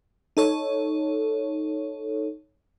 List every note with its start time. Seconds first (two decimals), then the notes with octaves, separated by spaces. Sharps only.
0.37 D#4 A4 C#5